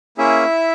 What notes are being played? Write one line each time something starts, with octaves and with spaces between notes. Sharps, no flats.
A#3 C#4 E4 G#4 E5